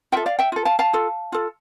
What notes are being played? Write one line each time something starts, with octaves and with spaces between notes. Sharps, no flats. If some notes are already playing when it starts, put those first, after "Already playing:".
F4 A4 E5 G5
D5 F5
E5 G5
F4 A4
F5 A5
F5 A5
F4 A4
F4 A4